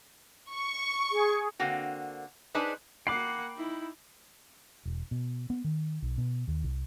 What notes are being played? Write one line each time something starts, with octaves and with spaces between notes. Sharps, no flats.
C#6
G#4
D3 A#3 C4 F#4
D4 D#4 G#4 B4 C5
A#3 F#5 G5 B5 D6 C7
D#4 E4
E1
B2
B3
D#3
B1
B2
D#2
C2